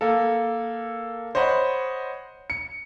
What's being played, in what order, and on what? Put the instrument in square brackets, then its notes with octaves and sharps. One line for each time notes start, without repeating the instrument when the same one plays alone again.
[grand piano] A#3 A4
C5 C#5 D#5 F#5 B5
C#7